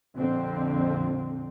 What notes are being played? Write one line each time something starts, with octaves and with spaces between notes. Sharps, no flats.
A#1 F2 D3 C4